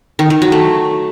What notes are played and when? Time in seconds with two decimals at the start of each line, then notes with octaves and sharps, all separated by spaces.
0.19 D#3
0.30 D#3
0.42 F#3
0.52 A3